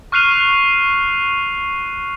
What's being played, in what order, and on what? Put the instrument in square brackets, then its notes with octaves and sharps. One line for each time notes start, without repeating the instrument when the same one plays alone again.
[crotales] C#6 F6 F#6 C7 D#7 F7